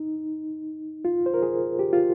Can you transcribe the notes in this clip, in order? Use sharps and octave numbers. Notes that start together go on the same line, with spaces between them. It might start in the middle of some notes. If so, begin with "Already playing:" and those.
Already playing: D#4
F4
C5
A#4
G#4
G4
F4